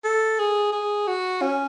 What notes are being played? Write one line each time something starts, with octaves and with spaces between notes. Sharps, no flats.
A4
G#4
G#4
F#4
C#4